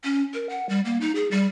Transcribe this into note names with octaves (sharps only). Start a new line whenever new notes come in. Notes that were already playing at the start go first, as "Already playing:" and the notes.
C#4
A#4
F#5
G3
A#3
D#4
G#4
G3